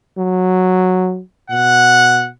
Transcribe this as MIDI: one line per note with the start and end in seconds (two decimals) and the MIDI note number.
0.18 1.20 54
1.50 2.31 47
1.50 2.28 78